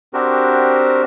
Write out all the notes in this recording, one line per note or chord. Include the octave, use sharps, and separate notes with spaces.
C4 D4 F#4 G4 A#4 C5